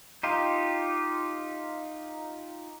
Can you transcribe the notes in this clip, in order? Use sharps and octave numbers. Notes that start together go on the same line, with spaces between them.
D#4 F4 G4